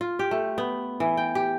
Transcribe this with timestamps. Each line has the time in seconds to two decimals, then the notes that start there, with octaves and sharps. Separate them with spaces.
0.01 F4
0.19 G4
0.31 A3
0.58 B3
1.00 E3
1.17 G5
1.35 G4